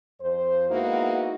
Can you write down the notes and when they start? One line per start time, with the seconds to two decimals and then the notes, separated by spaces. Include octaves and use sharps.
0.21 F2 C5
0.70 G#3 A#3 B3 D#4 E4 F#4